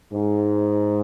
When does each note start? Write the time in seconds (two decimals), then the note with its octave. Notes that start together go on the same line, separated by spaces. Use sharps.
0.12 G#2